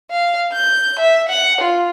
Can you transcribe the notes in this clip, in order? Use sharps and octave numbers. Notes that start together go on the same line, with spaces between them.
F5
G6
E5
F#5
F4